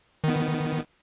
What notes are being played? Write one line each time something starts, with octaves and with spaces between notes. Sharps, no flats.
D#3 B3